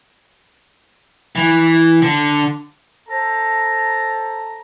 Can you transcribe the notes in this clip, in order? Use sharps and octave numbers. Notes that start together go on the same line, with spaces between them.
E3
D3
A4 C5 A5 A#5